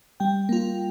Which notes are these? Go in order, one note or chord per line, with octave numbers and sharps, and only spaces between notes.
G3 G5
A#3 F4